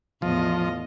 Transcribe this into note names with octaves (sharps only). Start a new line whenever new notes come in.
E2 A2 F3 D#5